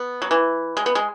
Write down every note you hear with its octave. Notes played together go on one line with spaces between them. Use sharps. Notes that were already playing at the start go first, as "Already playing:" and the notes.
Already playing: B3
F#3
E3
G#3
B3
G#3